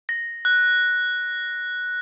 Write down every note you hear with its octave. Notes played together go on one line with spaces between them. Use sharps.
A#6
F#6